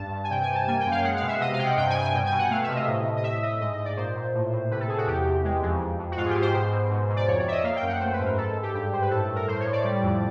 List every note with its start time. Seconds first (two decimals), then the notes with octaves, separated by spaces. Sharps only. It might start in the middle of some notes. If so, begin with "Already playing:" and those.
Already playing: G2 A5
0.12 G2
0.24 G#5
0.30 C3 G5
0.43 G#5
0.49 C3
0.55 A5
0.67 A#3 G#5
0.80 G5
0.86 F#2
0.91 F5
1.04 G#3 F#5
1.16 F5
1.22 B2
1.28 E5
1.40 C3 D#5
1.53 F5
1.59 C3 G5
1.65 F#5
1.77 G2 G5
1.90 G#5
1.95 G2
2.01 G#5
2.14 B2 G5
2.26 G#5
2.32 B2
2.38 F#5
2.50 A3 F5
2.63 E5
2.69 C3
2.76 D#5
2.87 A2
3.06 A2
3.17 D#5
3.23 A2 E5
3.42 A2 D#5
3.60 G#2 D#5
3.73 D#5
3.79 G#2
3.85 D5
3.97 A#2 C5
4.16 A#2
4.34 A2
4.52 A2
4.71 C3 B4
4.80 A4
4.88 C3 G#4
4.98 F#4
5.07 E2 G4
5.25 E2
5.44 G#3
5.62 F2
5.80 F2
5.99 F2
6.11 F#4
6.17 G#2 F4
6.25 G#4
6.30 G4
6.36 G#2
6.41 C5
6.54 B2 C5
6.72 B2
6.90 G#2
7.09 G#2
7.16 D5
7.27 F2 C#5
7.39 D5
7.45 F2 E5
7.51 D#5
7.63 A#3 F5
7.76 G5
7.82 F#2
7.89 F#5
8.00 A3 C5
8.13 B4
8.19 G#2
8.25 A#4
8.37 G#2 A4
8.56 G#2
8.62 G4
8.74 G2 G4
8.92 G2 C5
9.01 B4
9.10 A2 A4
9.23 A4
9.29 A2
9.35 A#4
9.47 A2 C5
9.60 C#5
9.66 A2
9.72 D5
9.84 G3
10.02 F2